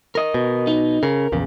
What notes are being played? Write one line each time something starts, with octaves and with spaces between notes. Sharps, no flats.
A#4 D#5
B2
D#4
C#3 A#4
A#1 E2 C#3